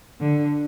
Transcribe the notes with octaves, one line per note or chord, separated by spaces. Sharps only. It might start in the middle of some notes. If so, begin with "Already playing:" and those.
D3